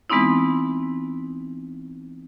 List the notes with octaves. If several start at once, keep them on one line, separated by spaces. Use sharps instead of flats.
E3 G#3 B3 C4 D#4 E4